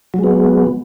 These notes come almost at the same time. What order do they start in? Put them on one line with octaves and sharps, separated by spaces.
F#3 G#3 B3